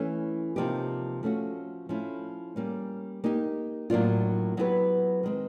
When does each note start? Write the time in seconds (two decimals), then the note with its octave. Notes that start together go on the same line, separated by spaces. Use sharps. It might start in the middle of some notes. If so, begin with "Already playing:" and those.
Already playing: E3 A3 C#4
0.56 C3 F3 A#3 D#4 G4
1.23 F3 A3 C#4 F#4
1.89 F3 A3 C#4 E4
2.56 G3 A#3 C#4
3.24 A#3 D#4 G4
3.90 A2 F#3 A#3 D4 F4
4.57 F#3 B3 E4 G4 B4
5.23 D#3 G#3 C4